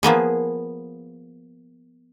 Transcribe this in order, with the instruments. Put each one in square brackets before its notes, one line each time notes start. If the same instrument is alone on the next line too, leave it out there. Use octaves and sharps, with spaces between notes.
[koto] F3 A#3 B3 G#4